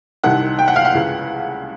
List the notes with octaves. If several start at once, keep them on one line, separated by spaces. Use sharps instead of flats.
C2 C3 D#3 F#5
G5
F#5
F5
F#5
C#2 C#3 E3